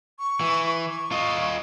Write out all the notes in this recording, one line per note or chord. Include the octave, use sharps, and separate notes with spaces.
C#6
E3
C#6
F4 D#5